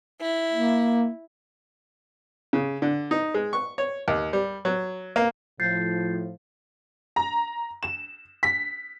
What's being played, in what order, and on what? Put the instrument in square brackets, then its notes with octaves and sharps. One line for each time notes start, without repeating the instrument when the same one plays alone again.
[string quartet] E4
[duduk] A#3
[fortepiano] C#3
D3
D#4
G#3
C#6
C#5
D#2
G3
F#3
A#3
[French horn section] A2 F3 [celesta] G6 A6 C7
[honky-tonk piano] A#5
E7
B6